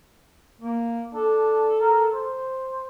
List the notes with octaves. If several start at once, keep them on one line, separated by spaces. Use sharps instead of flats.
A#3
D4 A4
A#4
C5